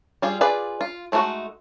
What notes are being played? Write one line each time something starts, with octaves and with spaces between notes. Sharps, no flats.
G3 F4 G#4
F4 G#4 B4 D5
F4
G#3 A3 D#4 F4 F#4